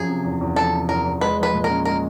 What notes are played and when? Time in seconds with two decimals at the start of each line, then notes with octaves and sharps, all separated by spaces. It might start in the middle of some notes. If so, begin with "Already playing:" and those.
Already playing: F#2 F3 G#4
0.08 C3
0.24 E2
0.41 E2
0.56 F3 A4
0.73 C3
0.88 E2 A#4
1.05 E2
1.21 G#3 B4
1.37 F3
1.43 B4
1.53 A#2
1.64 A#4
1.69 C#4
1.85 G#3 A#4